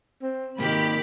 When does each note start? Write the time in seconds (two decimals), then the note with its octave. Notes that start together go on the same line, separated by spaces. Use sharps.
0.22 C4
0.59 G#2 C3 D#3 A#3 G4 B5